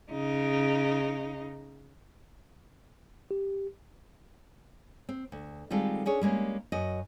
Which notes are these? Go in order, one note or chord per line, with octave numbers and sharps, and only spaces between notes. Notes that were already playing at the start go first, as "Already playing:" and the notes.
C#3 D#4
G4
C4
D2
D#3 G3 G#3 C4 F4 A4
C#4 D4 G#4 C#5
G3 G#3 A#3 C#4
F#2 F#4 D#5